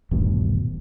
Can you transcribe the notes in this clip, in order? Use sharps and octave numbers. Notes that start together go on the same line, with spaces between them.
D#1 A1 G2 B2